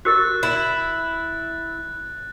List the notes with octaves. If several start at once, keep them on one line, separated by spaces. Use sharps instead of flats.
F#4 G4 A#4 F#6 A6
E4